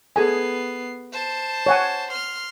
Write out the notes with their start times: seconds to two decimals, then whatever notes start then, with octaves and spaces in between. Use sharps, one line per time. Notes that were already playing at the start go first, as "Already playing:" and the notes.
0.16 B3 G#4 A4 G#5 C7
1.13 C5 A5
1.66 C#5 F#5 G#5
2.11 C6 F6